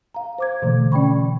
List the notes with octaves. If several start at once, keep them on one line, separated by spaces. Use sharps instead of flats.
F5 A#5
C5 D6 G#6
B2 D3 E3 A3
C#4 D5 G5 B5 C#6